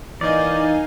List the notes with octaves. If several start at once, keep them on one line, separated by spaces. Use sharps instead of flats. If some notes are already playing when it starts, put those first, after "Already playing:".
E3 A#3 D#4 D5 D#5 F5 G#5